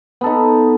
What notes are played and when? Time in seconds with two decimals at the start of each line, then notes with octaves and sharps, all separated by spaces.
0.21 B3
0.24 A4
0.26 D#4